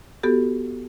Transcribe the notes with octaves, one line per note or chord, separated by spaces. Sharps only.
B3 F#4 G4 A4